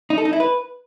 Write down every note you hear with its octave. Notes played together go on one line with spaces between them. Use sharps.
D#4
A4
D#4
E4
B4